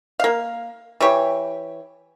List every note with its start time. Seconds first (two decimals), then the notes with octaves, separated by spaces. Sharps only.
0.20 A#3 F5
1.00 E3 G4 C#5